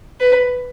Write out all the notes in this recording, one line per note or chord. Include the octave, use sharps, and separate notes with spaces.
B4